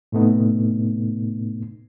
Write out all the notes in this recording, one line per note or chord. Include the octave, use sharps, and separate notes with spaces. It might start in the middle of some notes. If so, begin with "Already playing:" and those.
A2 C3 A3 B3 D#4